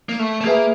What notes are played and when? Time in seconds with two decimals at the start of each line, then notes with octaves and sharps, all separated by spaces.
0.09 A#3
0.19 A3
0.41 A3
0.44 A#3 G#4 B4 E5 G#5